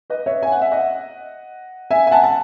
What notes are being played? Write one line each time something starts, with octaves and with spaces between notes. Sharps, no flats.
B4 D#5
C#5 E5
G#5
F#5
E5
D#5 F#5
E5 G#5
G#5
F#5 A5
A5